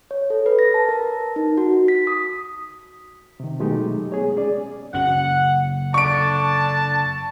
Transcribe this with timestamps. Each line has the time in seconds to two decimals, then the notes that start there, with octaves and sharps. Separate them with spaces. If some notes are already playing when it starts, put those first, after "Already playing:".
0.11 C#5
0.30 A4
0.46 B4
0.59 A#6
0.74 A5
0.89 A#4
1.36 D#4
1.57 F#4
1.88 B6
2.07 D#6
3.40 C3 D#3
3.60 B2 F#3 G#3 A3 D#4 G4
4.12 B3 G#4 C#5
4.36 C#4 G#4 D5
4.93 F#1 F#2 C#4 F#5
5.94 D3 D4 A5 C#6 D7